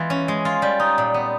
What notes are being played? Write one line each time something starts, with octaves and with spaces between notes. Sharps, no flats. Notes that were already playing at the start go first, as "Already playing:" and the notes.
Already playing: E3 G#3 B3 F4
C#4
G#3
F4
G3
D#4
A#2
B3